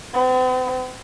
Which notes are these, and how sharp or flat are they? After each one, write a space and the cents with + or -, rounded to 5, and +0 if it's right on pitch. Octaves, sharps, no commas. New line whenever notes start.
C4 -45